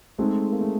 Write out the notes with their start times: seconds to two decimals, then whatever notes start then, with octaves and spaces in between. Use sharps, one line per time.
0.18 G#3 A3 C4 D#4 G#4
0.52 A#3
0.61 A3